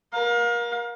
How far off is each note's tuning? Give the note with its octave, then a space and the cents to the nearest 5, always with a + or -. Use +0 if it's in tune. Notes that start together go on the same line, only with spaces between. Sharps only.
A#4 +30 F5 +30